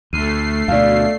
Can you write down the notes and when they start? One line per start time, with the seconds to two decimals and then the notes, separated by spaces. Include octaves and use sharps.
0.13 D2 A3 C7 D#7
0.68 D2 B2 D5 F5